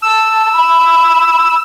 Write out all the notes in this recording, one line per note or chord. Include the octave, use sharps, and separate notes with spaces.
A5 E6
B5